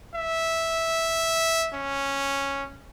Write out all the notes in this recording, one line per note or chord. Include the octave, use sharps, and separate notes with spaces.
E5
C#4